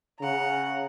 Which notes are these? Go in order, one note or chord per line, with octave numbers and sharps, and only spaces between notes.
C#3 F#5 A#5